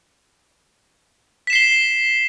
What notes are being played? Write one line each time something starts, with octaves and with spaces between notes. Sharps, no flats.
B6 C7 E7 G7